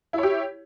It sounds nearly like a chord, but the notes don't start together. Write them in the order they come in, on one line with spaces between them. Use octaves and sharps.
E4 C#5 G4